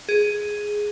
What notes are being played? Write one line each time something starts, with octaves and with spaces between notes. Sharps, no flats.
G#4